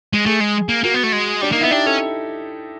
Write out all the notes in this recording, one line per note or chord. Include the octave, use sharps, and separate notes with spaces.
G#3
A3 G#4
G#3
A#3
A#3 F#4
B3
A3
G#3
G3 D4
A#3 D#4
B3 E4
D4 G4
C#4 A4